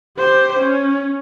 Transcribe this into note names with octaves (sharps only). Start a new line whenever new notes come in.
G4 C5
C#4